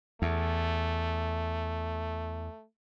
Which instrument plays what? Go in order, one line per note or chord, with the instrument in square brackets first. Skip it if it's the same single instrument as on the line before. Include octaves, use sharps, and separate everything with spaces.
[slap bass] E2 [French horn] A3